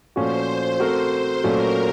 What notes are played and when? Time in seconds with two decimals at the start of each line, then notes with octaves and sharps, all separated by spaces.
0.16 A#2 F3 A3 C#4 F#4 C5
0.80 A3 C4 F#4 A#4
1.44 A#2 F#3 A3 C#4 A#4